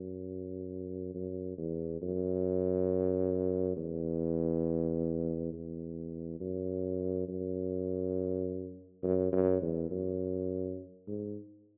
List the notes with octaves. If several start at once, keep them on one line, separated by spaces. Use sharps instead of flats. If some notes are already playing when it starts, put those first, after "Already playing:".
Already playing: F#2
F#2
E2
F#2
E2
E2
F#2
F#2
F#2
F#2
E2
F#2
G#2